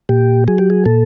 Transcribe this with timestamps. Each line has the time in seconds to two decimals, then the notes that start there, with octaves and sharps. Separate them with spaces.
0.09 A#2 G4
0.48 F#3 G#4
0.58 G4
0.70 G#4
0.86 A#2 A4